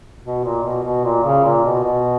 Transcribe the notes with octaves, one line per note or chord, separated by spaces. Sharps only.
B2
A#2
B2
B2
A#2
C#3
A#2
B2
B2